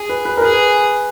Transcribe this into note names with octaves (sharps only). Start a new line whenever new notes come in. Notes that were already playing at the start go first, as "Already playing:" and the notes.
Already playing: G#4
B4
B4
A#4
G#4 B4